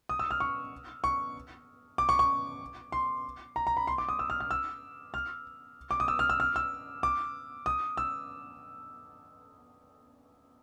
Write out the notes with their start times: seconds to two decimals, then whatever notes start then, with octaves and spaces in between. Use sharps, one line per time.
0.09 D#6
0.19 E6
0.31 F6
0.40 C#6
1.04 C#6
1.98 D6
2.09 C#6
2.19 C#6
2.92 C6
3.56 A#5
3.67 A#5
3.77 B5
3.87 C6
3.98 D6
4.09 D#6
4.19 E6
4.30 F6
4.40 F6
4.51 E6
5.14 F6
5.91 D6
6.00 D#6
6.08 E6
6.19 F6
6.30 E6
6.40 F6
6.56 E6
7.03 D6
7.66 D#6
7.97 E6